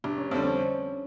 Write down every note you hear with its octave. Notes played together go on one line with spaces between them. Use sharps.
F1 D4
C#4
F2 D3 G3 C4
C#4